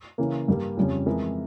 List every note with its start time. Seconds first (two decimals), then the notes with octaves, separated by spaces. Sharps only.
0.18 C#3 E3 A#3
0.48 G2 G3 A#3
0.77 F2 C#3 G3 C#4
1.06 F2 E3 G#3 E4 A#4